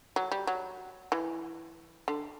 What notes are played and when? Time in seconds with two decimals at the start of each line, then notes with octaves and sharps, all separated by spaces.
0.16 F#3
0.32 G3
0.47 F#3
1.12 E3
2.08 D3